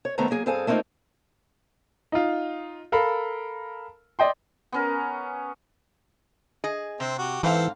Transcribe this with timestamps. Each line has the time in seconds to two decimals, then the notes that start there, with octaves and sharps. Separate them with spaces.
0.05 C#5
0.18 D#2 D#3 A3 B3 C4 A#5
0.30 F#3 A#3 G#4
0.46 G2 C4 G#4 A4 F5 G#5
0.67 A3 A#3 C4 D4 D#4 F4
2.12 D#4 F4
2.92 A4 A#4 F5 B5
4.19 D5 D#5 G5 C6
4.72 B3 C#4 A#4
6.64 G#4 D#5
7.00 C3 C4
7.18 F#4 G4
7.43 G#2 E3 C4 A4 F5